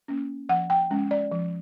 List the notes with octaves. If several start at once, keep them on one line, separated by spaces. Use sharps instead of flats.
A#3 C#4
F3 F#5
G5
G#3 C#4
D5
F3